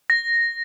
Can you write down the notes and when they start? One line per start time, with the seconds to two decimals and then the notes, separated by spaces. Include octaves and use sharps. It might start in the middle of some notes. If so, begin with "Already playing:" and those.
0.10 A#6